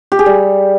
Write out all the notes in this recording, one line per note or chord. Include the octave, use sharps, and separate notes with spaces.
G4
G#4
G3